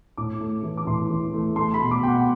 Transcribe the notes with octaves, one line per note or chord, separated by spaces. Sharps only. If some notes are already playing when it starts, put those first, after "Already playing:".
A2 D6
A3
E3
D6
A2 C6
E3
A3
A3 C6
B5
B2
D6
B2 G5
F#5